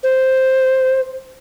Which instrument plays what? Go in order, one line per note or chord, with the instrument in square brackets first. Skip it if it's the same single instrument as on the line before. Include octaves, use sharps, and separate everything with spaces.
[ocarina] C5